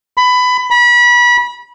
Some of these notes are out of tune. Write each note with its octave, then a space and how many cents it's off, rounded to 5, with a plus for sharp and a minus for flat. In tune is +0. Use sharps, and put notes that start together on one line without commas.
B5 +20
B5 -30